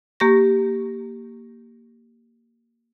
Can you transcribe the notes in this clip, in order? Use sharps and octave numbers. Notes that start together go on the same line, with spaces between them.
A#3 G4 C#6 A#6